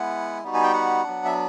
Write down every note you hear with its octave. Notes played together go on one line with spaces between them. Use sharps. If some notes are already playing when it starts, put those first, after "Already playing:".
Already playing: G#3 B3 E4 F#5
G3 B3 D#4 F#4
G#5
G5
F#5
F#3 B3 D4
E5